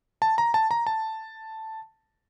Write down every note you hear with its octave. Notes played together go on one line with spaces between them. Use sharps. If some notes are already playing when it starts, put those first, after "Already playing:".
A5
A#5
A5
A#5
A5